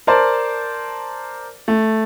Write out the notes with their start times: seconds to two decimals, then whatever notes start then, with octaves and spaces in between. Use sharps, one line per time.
0.07 A#4 C5 D5 A5
1.68 A3